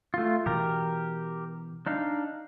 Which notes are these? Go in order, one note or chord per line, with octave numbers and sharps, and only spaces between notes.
A3 F4
B2 E3 G4 A#4
D4 D#4 F5